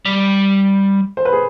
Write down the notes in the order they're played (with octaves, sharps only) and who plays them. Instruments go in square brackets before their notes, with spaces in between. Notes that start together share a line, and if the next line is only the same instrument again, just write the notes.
[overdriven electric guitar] G3
[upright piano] C5
B4
G#4